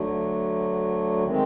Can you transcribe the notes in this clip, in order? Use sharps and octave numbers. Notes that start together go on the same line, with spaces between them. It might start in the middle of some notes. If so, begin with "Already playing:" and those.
Already playing: D2 D3 F#3 A3
D#3 G#3 C4